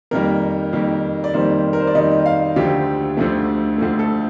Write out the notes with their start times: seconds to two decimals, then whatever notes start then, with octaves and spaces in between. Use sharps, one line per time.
0.11 F2 D#3 G3 A#3 A#4
0.73 F2 D#3 G3 A#3
1.24 D5
1.34 F2 D#3 G3 A#3 C5
1.73 A#4
1.80 C5
1.87 D5
1.95 F2 D#3 G3 A#3 D#5
2.26 F5
2.56 D2 D3 F3 A3 G4
3.17 D2 D3 F3 A3
3.78 D2 D3 F3 A3
3.99 A4